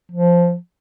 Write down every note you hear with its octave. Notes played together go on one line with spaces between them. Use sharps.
F3